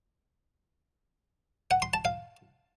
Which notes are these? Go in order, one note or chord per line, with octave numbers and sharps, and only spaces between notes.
F#5
C6
A5
F5